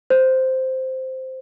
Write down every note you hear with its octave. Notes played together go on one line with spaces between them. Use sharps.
C5